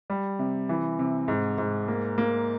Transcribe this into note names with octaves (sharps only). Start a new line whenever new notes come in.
G3
C3
E3
C3
G#2
G#2
A#3
A#3